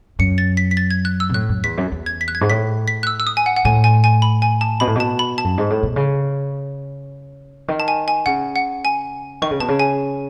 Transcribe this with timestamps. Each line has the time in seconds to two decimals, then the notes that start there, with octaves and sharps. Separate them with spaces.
0.19 F#2 C#7
0.38 A6
0.57 B6
0.71 B6
0.77 A6
0.91 G#6
1.05 F#6
1.20 E6
1.29 B2
1.34 A2 F#6
1.49 F#2
1.64 E2 B6
1.77 F#2
1.92 E2
2.06 G#6
2.21 B6
2.28 F#6
2.35 G#6
2.41 G#2
2.50 A2 B6
2.88 B6
3.03 F#6
3.07 E6
3.20 E6
3.27 D#6
3.37 G#5
3.46 F#5
3.56 F#5
3.65 A2 G#5
3.84 G#5
4.04 G#5
4.22 B5
4.42 G#5
4.61 A5
4.80 B2 B5
4.87 A2
4.95 B2 A5
5.19 B5
5.38 A5
5.44 F#2
5.58 G#2
5.70 A2
5.83 B2
5.96 C#3
7.68 D#3
7.80 A5
7.88 G#5
8.08 G#5
8.26 C#3 F#5
8.56 F#5
8.85 G#5
9.42 D#3 C#6
9.51 C#3
9.60 B2 A5
9.68 C#3
9.80 G#5